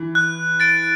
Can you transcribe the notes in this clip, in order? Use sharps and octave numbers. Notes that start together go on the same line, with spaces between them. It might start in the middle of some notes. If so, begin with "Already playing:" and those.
Already playing: E3
F#6
A6 D7